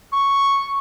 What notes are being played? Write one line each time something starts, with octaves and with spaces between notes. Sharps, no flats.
C#6